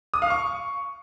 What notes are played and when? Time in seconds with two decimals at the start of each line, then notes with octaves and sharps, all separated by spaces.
0.14 D#6
0.22 F5
0.30 C#6